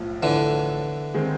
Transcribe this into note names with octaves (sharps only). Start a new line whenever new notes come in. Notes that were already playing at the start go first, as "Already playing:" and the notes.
Already playing: B1 A2 F3
D3 E3
D#3 G#3 C4